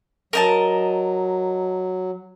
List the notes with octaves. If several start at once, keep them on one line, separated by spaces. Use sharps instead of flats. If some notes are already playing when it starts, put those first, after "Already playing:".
F#3 A#4 D#5 A5